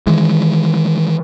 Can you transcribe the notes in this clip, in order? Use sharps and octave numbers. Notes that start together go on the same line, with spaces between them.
D#3 E3 G#3